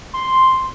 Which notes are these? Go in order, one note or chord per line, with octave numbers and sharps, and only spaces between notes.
C6